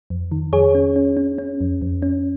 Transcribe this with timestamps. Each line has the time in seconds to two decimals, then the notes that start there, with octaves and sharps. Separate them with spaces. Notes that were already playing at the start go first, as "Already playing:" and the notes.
0.10 F2
0.31 D#3
0.53 F2 G#4 C#5
0.75 C#4
0.96 C#4
1.17 C#4
1.38 C#4
1.61 F2
1.82 F2
2.02 C#4